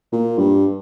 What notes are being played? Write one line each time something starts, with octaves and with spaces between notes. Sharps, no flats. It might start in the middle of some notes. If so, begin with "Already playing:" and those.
A#2
G2